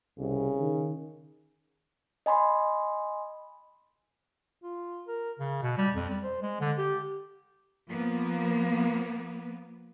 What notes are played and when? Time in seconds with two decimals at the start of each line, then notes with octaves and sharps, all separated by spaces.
0.19 C2 C#3
0.60 D#3
2.26 D#5 G#5 B5 C6
4.62 F4
5.08 A#4
5.39 C#3
5.62 B2
5.78 G3
5.94 F2
6.09 G3
6.23 C5
6.42 G#3
6.61 D3
6.78 G4
7.89 F3 A#3 B3